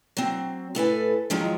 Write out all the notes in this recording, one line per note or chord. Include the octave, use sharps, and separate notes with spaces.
F#3 C4
A2 A4 B4 G#5
G#2 D#3 F3 F#3 G#3